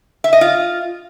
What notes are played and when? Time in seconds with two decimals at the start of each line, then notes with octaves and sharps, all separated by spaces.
0.24 E5
0.33 D#5
0.41 F4